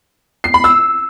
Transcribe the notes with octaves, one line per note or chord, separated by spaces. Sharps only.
C7
B5
E6